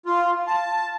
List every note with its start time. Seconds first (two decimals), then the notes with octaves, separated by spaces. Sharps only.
0.06 F4
0.47 A5